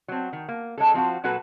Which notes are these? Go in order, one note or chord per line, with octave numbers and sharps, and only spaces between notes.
F#3 C4
D#3
A#3
G#3 C#4 A4
F3 C4 F4 F#4
A#2 F#3 F#4 A4 B4